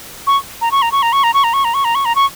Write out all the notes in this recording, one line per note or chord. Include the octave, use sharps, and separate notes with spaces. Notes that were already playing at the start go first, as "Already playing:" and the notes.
C#6
A#5
C#6
A#5
C#6
A#5
C#6
A#5
C#6
A#5
C#6
A#5
C#6
A#5
C#6
A#5
C#6